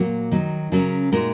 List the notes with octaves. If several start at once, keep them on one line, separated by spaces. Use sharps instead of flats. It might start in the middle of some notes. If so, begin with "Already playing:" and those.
Already playing: A#2 F#3 A#3 F#4
D#3 F#3 D#4
C#3 F#3 C#4 A#4
A#2 G#3 D#4 F#4 A#4